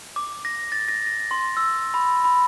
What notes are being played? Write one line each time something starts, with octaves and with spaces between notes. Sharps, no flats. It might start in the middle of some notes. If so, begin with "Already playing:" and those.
D6
A#6
A6
A#6
A#6
C6
E6
B5
B5